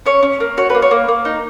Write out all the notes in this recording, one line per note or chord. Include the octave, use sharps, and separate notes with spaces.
C#4 C#5
C#4
A#3
F#4 C#5
B4
A#3
C#5
A#3
A#3
D#4